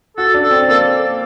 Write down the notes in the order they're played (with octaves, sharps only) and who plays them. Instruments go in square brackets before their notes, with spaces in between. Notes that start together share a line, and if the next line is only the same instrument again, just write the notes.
[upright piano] F#4 [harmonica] A4
[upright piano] D4
[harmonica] A4
[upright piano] C4
[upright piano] A#3 [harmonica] A4